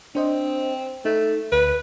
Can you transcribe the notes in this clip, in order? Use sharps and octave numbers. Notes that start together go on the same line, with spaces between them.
C4 D4 C5 D#5
A3 D#4
D2 B4